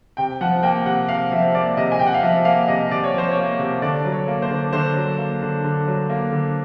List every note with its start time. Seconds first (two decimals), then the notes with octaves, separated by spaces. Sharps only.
0.17 C3 G5
0.41 F3 F#5
0.63 A#3 G5
0.85 C3 F#5
1.09 C3 F5
1.32 F3 E5
1.54 A#3 D5
1.77 C3 D#5
1.92 G#5
1.99 C3 G5
2.07 F#5
2.14 F5
2.22 F3 E5
2.45 A#3 F5
2.68 C3 D#5
2.91 C3 D5
3.04 C#5
3.14 F3 C5
3.31 C#5
3.37 A#3
3.59 C3
3.82 D3 D5
4.05 F#3
4.12 C#5
4.28 A#3
4.42 C5
4.51 D3
4.73 D3 C5
4.97 F#3
5.18 A#3
5.42 D3
5.64 D3
5.88 F#3
6.09 A#3
6.32 D3